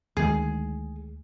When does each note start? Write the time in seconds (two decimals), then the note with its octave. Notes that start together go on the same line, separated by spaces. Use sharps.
0.17 D2 D#3 G#3 G#4